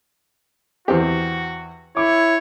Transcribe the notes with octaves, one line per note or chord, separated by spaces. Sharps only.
E2 C4 F#4 G4
E4 C#5 D6